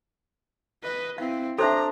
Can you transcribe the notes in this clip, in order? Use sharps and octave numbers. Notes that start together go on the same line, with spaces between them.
B4 D#5
C4 E4 F5
C4 D4 A4 C5 E5 A#5